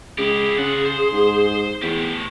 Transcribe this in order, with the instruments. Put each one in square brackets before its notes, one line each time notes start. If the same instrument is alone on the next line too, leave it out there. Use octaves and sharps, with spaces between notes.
[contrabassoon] C#2 [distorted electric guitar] E4 G4 [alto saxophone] G#4
[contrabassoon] C#3 [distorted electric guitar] F4 F#5
[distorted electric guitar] C5
[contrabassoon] G#2
[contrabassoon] E2 [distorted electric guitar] A3 G4